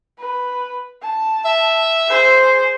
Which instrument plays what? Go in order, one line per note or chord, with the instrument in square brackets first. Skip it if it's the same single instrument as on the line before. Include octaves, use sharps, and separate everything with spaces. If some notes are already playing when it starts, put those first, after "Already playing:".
[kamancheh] B4
A5
[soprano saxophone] E5
[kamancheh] G#4 C5